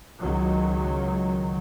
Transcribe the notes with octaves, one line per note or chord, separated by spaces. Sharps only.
C#2 D#3 F#3